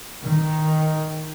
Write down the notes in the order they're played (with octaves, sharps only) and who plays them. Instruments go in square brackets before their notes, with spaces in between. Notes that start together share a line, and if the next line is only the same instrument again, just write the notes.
[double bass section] D#3